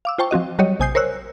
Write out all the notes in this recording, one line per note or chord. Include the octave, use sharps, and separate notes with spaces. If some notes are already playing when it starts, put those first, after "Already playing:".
F5 D6 E6
F4 C5 G5 A5 C#6
F3 C4 F#4 D#5
F#3 G3 F#4 G4 C#5 D#5
A#1 C3 G#5 D#6 G6 C7
A#4 C5 C#5 E6 F#6